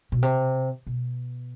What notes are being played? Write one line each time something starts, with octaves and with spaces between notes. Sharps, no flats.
B2
C3
B2